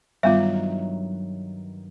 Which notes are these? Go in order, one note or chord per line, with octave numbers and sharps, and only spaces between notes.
G2 D#3 F#3 G3 B3 F4 E5